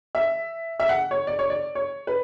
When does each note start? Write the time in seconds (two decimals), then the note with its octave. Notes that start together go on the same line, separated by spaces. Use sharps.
0.15 E5
0.80 E5
0.89 F#5
1.11 C#5
1.27 D5
1.39 C#5
1.50 D5
1.75 C#5
2.07 B4